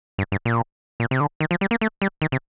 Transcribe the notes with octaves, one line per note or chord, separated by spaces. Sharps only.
G2
G2
A#2
A#2
C3
D3
D#3
F3
G3
A#3
A3
G3
D#3
C3